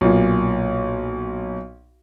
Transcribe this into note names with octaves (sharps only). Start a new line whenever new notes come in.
B1 A#2